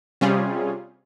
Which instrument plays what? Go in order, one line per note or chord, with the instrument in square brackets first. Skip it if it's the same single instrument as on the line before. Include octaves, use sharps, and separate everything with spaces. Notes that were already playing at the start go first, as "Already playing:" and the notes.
[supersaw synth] C3 G3 C#4 F4 G#4